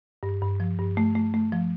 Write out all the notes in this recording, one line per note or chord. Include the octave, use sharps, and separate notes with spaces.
G2
G2
F3
G2
A3
A3
A3
F3